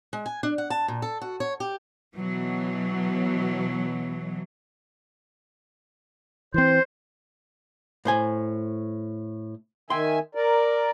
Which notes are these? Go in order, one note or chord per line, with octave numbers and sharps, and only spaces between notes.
G#3
G#5
D4
F#5
A5
A#2
A4
F#4
C#5
G4
B2 E3 F#3
E3 C4 C5
A2 C5 G#5
D#3 E5 G5 G#5 C6
A#4 D5